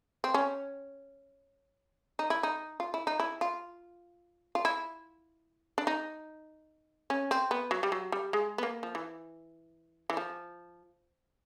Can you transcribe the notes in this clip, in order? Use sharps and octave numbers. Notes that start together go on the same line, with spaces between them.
C4
C#4
D#4
E4
D#4
F4
E4
D#4
E4
F4
F4
E4
D4
D#4
C#4
C4
B3
F#3
G3
F#3
G3
G#3
B3
A#3
F3
E3
E3
F3